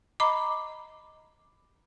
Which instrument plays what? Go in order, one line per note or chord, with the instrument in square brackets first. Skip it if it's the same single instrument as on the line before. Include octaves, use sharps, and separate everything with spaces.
[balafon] D#5 A#5 B5 D6